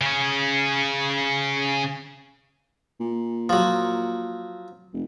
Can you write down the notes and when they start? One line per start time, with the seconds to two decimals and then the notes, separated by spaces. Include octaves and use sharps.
0.01 C#3 C#4
3.00 A#2
3.49 F3 F#3
4.93 F1